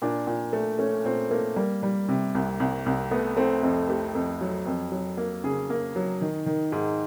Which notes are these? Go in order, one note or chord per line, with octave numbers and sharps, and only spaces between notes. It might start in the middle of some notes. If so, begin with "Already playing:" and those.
A#2 D4
A#2
A3
A3 C#4
A#2 C4
A3 A#3
G3 A#3
G3
C3
C2
C2
C2
A3 B3
A3 C4
F2
A3 G4
F2
F#3
F2
F#3
A#3
C#3 G#4
A#3
F#3
D#3
D#3
G#2